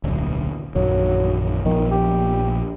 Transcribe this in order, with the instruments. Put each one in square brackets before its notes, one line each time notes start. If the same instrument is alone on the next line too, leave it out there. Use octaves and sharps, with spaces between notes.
[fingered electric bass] D1 B1
[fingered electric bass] A#1 F#2 D#3 [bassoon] F#3
[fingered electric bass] A#1 F3 B3 [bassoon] D#3
[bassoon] G4